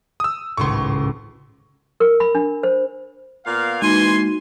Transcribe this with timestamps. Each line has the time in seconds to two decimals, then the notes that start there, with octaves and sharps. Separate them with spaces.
0.20 D#6 E6
0.57 G#1 C#2 A2 C6 C#6
2.00 A#4
2.20 B5
2.35 D4
2.63 C5
3.45 A#2 B3 F5
3.82 E3 G#3 A#3 D#4 F#4 G#5 C6 D#7